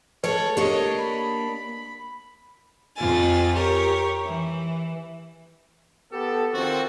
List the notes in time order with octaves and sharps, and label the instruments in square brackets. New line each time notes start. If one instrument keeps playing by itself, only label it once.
[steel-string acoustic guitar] G#3 A4 [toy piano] B4 [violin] C#5
[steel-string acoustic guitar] A#3 D4 [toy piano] G4 [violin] C#5 D#5
[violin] B5
[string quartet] F2 F4 G#5 A6
G4 A#4 C#5
E3
[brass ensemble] B3 G4 A4
D#3 F3 C4 F#4 A4